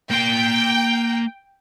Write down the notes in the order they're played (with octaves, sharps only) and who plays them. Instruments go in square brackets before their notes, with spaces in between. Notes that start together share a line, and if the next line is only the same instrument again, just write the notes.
[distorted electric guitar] A#3 C6 [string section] G5